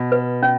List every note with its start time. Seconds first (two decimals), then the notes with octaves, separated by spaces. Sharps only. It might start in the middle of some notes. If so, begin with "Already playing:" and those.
Already playing: B2
0.12 B4
0.43 C#4